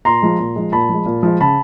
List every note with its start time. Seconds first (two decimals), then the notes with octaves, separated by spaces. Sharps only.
0.05 A#2 A#5 C6
0.22 F3 G#3
0.40 A#2
0.56 F3 G#3
0.72 A#2 A5 B5
0.89 F3 G#3
1.06 A#2
1.23 F3 G#3
1.40 C#3 A5 B5